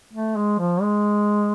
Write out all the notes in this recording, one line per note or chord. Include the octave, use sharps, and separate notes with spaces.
A3
G#3
F3
G#3